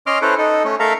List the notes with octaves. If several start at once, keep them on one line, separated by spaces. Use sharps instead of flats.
C#4 D#5 C6 D6 F6
C#4 E4 A4 B4 C5
D#4 A4
A3 C#4
A3 A4 A#4 E5 F5 A#5